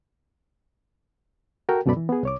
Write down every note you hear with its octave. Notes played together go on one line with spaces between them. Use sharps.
F#4 A4 A#4 G5
C#2 F#2 B2 A4 D5 B5
E3
B3 G#4
C2 C#5 D6